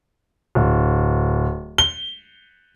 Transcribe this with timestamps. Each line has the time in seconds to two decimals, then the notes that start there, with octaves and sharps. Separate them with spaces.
0.55 D1
1.78 G7